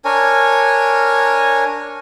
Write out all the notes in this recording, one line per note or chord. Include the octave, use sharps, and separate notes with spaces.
D4 A#4 C#5 G#5